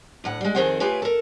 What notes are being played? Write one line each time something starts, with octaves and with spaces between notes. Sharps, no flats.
D2 A2 F#5
G3 G#3
F2 D#3 C4 G#4 C5 F#5
A3 F4 G4 G#4 B4 C#5
A4 A#4